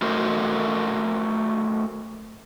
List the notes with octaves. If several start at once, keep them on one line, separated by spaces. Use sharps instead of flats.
A3 F#4 A#4 C5 D#5